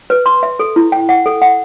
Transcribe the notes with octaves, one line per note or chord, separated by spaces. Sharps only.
B4
C6
E5
A4
E4
G5
F#5
A4
F#5